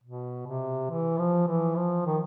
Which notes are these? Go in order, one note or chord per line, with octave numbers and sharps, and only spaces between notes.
B2
C3
E3
F3
E3
F3
D#3